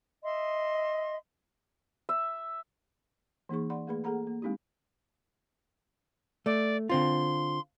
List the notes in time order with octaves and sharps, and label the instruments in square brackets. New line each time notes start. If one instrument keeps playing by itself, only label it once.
[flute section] D#5 E5 C6
[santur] E5
[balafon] E3 A#3 D#4 G#4 C#6
D5 F#5 B5 C6
A3 A#3 G#4 B4 B5
A#3 G#4 A4 F#5 A#5 B5
A#3
G#3 C4 D#4 E4 G4
[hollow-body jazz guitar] A3 [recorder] D5
[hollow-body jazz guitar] D3 C4 F4 [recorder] C6